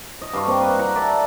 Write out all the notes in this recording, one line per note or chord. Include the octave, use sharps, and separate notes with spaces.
D#5
G2 F5 C#6
G2 A#3 C4
B4
F#5 A#5
A#4 D5 E5 A5